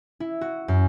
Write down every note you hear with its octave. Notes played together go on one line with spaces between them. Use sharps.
E4
F#4
F#2